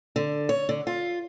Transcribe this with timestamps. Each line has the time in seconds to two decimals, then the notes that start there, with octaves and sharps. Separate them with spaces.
0.16 D3
0.49 C#5
0.69 D3
0.87 F4